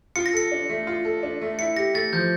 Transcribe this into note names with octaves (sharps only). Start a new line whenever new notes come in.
F4 C#7
A#6
A4 C#7
D4
A3
F4
A4
D4
A3
E4 C#7
G4 A#6
A3 A6
F3 G6